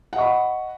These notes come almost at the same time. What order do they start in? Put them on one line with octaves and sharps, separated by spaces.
F#5 D#5 C#6 B5